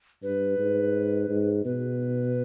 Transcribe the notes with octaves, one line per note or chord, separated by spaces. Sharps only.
G2 B4
G#2
G#2
B2 B4